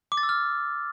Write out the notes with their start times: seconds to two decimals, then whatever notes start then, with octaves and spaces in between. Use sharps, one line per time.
0.12 D6
0.17 A6
0.23 E6
0.29 F6